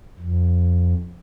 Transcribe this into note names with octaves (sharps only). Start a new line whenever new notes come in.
F2